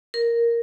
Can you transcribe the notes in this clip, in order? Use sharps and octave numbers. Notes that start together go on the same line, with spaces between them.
A#4